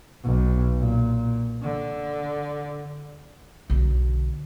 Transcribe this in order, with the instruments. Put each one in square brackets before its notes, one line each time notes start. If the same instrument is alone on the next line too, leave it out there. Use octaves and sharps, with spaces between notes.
[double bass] B1
A#2
D3
[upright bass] B1 D3